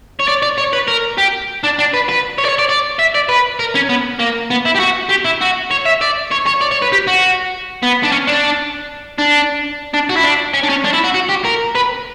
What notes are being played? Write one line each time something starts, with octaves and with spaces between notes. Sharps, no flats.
C#5
D5
D5
C#5
B4
A#4
G4
D4
D4
B4
B4
C#5
D5
C#5
D5
D5
E5
D5
B4
A#4
C#4
B3
A#3
B3
E4
G4
F#4
G4
E4
F#4
C#5
E5
D5
C#5
C#5
D5
C#5
B4
G4
F#4
B3
D4
C#4
D4
D4
D4
F#4
E4
D4
C#4
D4
C#4
D4
E4
F#4
F#4
G4
A#4
B4